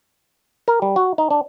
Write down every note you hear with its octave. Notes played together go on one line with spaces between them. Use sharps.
A#4
G3
F#4
D#4
D4